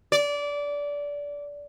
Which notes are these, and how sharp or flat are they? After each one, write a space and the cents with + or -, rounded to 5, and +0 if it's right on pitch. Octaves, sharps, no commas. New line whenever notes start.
D5 -20